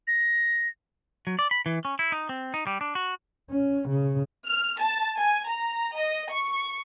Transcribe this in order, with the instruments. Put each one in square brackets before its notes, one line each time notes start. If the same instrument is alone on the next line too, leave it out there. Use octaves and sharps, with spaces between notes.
[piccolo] A#6
[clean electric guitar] F#3
D5
B5
E3
C#4
E4
D#4
C4
D#4
G3
D4
F#4
[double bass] C#4
C#3
[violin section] F6
A5
G#5
A#5
D#5
C#6